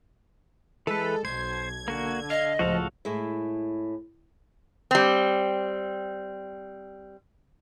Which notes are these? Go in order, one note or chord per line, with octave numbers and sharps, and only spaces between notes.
E3 G#3 A4 B4
B1 B2 C5 G#6
D3 A#3 F#4
D#5 F5
C#2 A2 F3 F#4 A4 F5
A2 G#3 E4
G3 C4